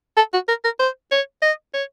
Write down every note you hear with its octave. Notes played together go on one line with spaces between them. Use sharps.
A4
F#4
A#4
A#4
C5
C#5
D#5
C#5